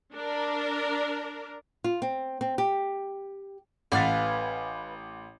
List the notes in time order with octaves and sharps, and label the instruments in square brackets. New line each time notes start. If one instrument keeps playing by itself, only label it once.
[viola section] D4 A#4
[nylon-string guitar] F4
C4
C4
G4
[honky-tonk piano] A1 F#5 A6 [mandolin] B4 F5 G#5